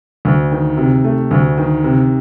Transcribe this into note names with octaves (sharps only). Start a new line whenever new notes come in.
D2
D#3
C3
A3
D2
D#3
C3